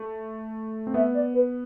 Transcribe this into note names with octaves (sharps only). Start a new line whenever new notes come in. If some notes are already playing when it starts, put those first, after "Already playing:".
Already playing: A3
C4
B3 E5
D5
B4